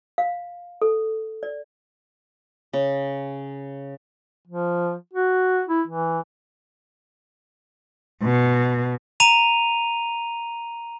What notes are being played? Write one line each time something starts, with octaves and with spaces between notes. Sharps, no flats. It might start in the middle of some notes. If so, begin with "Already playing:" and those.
F5
A4
D5
C#3
F3
F#4
E4
E3
B2
A#5 D#7 F7